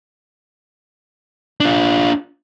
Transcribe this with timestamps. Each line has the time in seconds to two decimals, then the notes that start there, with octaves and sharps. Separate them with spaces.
1.60 D4 F4